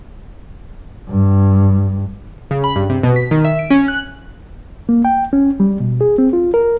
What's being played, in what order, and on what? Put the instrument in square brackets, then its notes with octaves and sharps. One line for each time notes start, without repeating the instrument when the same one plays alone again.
[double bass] G2
[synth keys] C#3
B5
G2
C3
B2
B6
D#3
E5
D7
C#4
F#6
[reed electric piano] A#3
G5
C#4
G3
B2
G#4
C4
F4
A#4